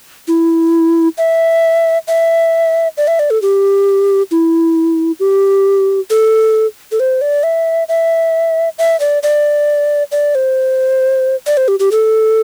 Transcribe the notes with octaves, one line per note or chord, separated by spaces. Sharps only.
E4
E5
E5
D5
E5
D5
A4
G4
E4
G4
A4
A4
C5
D5
E5
E5
E5
D5
D5
D5
C5
D5
C5
G4
G4
A4